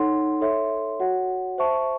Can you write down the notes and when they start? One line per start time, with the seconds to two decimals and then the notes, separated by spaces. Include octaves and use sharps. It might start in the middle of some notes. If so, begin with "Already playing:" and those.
Already playing: D#4 A4 C#5 F#5 C6
0.41 A4 C#5 E5 C6
1.00 F#4 C#5 F#5
1.58 C5 E5 A5 C#6